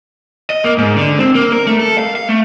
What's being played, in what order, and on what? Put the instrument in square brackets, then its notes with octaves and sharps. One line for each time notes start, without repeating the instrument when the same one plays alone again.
[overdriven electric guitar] D#5
A#3
G#2
D3
C4
A#3
A#4
A3
A4
F5
F5
A3